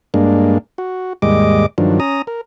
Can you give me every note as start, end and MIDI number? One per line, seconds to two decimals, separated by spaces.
0.14 0.58 43
0.14 0.58 56
0.14 0.58 58
0.14 0.58 62
0.78 1.13 66
1.22 1.66 39
1.22 1.66 44
1.22 1.66 55
1.22 1.66 56
1.22 1.66 75
1.22 1.66 86
1.78 2.00 43
1.78 2.00 51
1.78 2.00 53
1.78 2.00 54
1.78 2.00 62
2.00 2.22 61
2.00 2.22 82
2.00 2.22 87
2.27 2.41 70